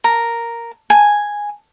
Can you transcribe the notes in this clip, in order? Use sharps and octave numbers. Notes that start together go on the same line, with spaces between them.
A#4
G#5